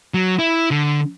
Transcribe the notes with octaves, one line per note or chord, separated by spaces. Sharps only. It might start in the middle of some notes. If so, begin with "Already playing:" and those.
F#3
E4
D3